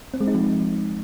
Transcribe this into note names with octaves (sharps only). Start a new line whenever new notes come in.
C4
G#3
D#4
F3